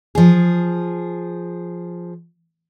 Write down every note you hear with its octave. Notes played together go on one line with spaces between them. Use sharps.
F3 G#4